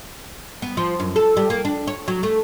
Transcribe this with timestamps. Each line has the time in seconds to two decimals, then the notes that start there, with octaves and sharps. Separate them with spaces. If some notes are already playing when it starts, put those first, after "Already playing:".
0.62 B3
0.77 F3
1.00 F#2
1.16 A4
1.37 G3
1.50 A#3
1.65 D4
1.87 C#5
2.08 F#3
2.23 A3